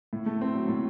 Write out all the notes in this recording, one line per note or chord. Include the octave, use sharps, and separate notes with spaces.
A2
A3
C4
F#3
A2